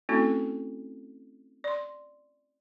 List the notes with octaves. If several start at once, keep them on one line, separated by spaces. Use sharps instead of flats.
A3 C4 C#4 E4 F#4 A4
D5 C6